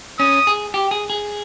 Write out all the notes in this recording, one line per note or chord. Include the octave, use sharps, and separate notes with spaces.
C#4 D#6
G#4
G4
G#4
G#4